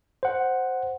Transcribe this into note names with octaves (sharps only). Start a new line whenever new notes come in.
C5 F#5